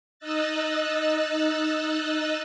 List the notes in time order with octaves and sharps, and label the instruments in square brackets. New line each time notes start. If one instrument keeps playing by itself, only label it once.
[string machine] D#4 D#5 E6 F#6 A6